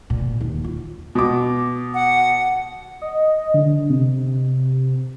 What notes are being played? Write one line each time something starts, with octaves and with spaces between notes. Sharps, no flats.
A#2
D#2
F4
B2 D6
F#5
D#5
D3
C3